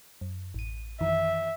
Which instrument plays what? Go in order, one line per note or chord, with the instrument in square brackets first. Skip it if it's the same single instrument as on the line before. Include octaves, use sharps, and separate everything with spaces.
[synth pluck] F#2
A1 D#7
[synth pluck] F#2 D#3 E3 [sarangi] E5